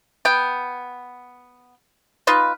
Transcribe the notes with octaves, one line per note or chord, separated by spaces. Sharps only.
B3 G5
D#4 F4 B4